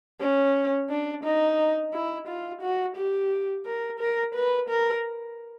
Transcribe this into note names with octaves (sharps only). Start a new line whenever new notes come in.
C#4
D4
D#4
E4
F4
F#4
G4
A#4
A#4
B4
A#4